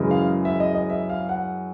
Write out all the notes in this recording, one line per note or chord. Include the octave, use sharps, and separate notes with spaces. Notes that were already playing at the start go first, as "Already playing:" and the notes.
Already playing: F#2 C#3 E3 G#3
F5
E5
D#5
D#5
E5
F5
F#5